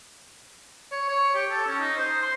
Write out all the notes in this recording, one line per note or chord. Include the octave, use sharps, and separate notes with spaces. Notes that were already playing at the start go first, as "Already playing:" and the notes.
C#5
C#5
G4
A4
C#4
D#4
C5
C6